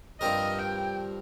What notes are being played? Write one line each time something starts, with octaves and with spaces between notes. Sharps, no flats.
G2 F3 C4 G4 A#4 D#5
G5